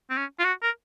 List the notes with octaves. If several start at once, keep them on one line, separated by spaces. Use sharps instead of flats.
C4
C#4
F4
F#4
A#4